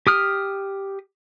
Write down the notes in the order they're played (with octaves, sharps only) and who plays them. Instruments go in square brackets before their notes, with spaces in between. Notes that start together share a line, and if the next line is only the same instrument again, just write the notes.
[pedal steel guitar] G4 D#6 F6